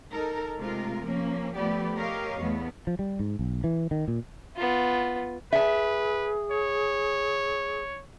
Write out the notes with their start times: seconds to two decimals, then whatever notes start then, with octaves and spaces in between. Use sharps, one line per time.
0.10 D#4 A4 A#4
0.58 C3 G#3 A3 F4 A#4
1.02 F3 A#3 C#4
1.55 F3 A3 B3 G4 B4 D5
1.96 G4 A#4 C#5 D#5 F5
2.39 E2 A3 B3
2.87 F3
2.99 G3
3.20 G#2
3.39 B1
3.64 E3
3.91 D#3
4.08 A#2
4.56 B3 F4
5.53 G#4 B4 E5 G#5
6.51 C#5